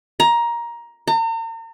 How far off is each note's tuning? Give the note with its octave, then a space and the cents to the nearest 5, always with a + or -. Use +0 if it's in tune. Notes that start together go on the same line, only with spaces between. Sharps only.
A#5 +15
A#5 -40